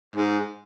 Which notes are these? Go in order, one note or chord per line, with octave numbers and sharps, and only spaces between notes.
G#2